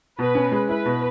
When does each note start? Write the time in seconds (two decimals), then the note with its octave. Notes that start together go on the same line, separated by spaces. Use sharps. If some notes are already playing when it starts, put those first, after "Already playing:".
0.19 B2 B4
0.35 C#4
0.52 G#3
0.68 E4 B4
0.86 B2